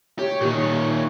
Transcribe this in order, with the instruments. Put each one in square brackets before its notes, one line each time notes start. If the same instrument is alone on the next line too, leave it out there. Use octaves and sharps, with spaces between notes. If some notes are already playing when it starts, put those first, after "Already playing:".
[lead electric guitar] G4 [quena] C#5
[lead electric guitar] A#2 D#3